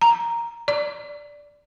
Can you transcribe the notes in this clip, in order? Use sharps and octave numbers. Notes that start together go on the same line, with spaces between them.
A#5
D5